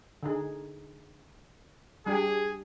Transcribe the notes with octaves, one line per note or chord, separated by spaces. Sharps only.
D3 D#4 G#4
G3 D4 G4 G#4